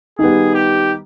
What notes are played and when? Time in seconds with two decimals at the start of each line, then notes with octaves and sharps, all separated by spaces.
0.19 D#3 G3 B3 G#4
0.54 G4